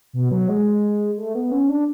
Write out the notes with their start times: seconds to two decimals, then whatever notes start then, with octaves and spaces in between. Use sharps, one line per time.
0.13 B2
0.32 F#3
0.49 G#3
1.17 A3
1.35 B3
1.51 C#4
1.69 D4